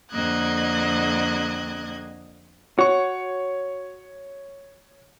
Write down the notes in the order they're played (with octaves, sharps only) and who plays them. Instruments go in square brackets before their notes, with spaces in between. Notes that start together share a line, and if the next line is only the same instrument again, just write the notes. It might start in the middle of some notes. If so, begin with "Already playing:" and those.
[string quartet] F2 D3 A#3 D#5 F#6 G#6
[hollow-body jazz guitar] F#4 [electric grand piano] C#5 C#6